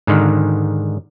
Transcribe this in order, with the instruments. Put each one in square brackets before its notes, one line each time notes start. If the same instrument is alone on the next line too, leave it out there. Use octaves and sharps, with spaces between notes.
[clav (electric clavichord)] G#2 D3 D#3